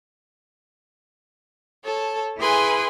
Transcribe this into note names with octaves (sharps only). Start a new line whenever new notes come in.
A4 C#5 A5
E4 G#4 B4 G#5 C6